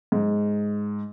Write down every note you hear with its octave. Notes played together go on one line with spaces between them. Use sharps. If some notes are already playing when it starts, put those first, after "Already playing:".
G#2